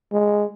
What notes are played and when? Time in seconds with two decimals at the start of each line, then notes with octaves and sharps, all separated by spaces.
0.12 G#3